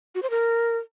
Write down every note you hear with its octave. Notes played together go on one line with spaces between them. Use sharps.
F#4
C5
A#4